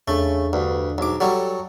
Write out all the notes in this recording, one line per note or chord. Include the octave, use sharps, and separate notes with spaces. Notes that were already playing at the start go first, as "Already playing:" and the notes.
E2 C#3 A3 D4 A4
D2 G2
B1 G#2 D6
F#3 G3 G4 A4